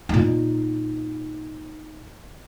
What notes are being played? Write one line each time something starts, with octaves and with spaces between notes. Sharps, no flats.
A#2 D#4